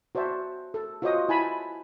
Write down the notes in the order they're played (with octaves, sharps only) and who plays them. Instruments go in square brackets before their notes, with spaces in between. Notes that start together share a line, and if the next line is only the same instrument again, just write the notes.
[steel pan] F#4 C5 D5 E5 A5
A4
F4 F#4 C5 C#5 D#5 D#6
E4 G#5 A5 B5